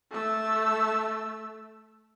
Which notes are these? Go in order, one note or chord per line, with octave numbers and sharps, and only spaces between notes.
A3 E6